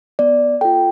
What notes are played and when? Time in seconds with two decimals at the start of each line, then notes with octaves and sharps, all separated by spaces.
0.19 B3 D5
0.61 F4 A4 G5